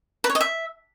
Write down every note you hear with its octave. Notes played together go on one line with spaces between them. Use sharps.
B4
C#5
D#5
E5